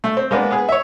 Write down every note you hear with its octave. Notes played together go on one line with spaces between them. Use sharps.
A3
C4
G#3 A#3 B3 D4
B3 G#4
C#5 E5